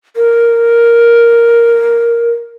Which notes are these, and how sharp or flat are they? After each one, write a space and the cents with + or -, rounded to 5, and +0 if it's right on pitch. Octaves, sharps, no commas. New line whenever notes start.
A#4 +0